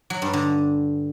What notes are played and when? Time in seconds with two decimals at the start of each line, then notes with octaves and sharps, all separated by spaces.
0.10 F#3
0.22 G2
0.33 D3